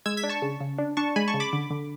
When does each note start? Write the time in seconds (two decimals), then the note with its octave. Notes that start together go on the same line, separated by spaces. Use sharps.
0.06 G#3 E6 G#6
0.17 G#6 B6
0.24 D4
0.29 A5 C#6
0.42 C#3
0.61 C#3
0.78 D4
0.97 D4 A5 C#6
1.16 G#3 G#5 B5
1.28 A5 C#6
1.34 C#3
1.40 B5 D6
1.53 D3
1.70 D3